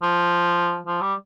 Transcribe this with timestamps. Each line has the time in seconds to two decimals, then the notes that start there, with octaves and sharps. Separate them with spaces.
0.02 F3
0.87 F3
1.01 G3